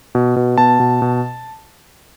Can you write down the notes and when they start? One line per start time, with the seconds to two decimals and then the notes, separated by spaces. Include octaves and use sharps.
0.15 B2
0.36 B2
0.58 B2 A5
0.80 B2
1.02 B2